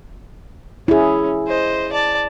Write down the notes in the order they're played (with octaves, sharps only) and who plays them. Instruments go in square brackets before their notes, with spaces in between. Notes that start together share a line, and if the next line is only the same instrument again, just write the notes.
[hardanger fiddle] C#4 [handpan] E4 G#4
[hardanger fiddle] C5 D#5
D5 A5